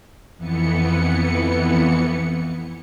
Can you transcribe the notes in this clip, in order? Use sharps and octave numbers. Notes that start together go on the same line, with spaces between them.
F2 E3 B3 C#7